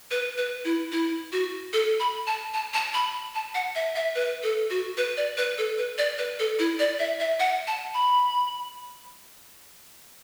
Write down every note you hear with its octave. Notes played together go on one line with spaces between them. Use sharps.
B4
B4
E4
E4
F#4
A4
B5
A5
A5
A5
B5
A5
F#5
E5
E5
B4
A4
F#4
B4
D5
B4
A4
B4
D5
B4
A4
E4
D5
E5
E5
F#5
A5
B5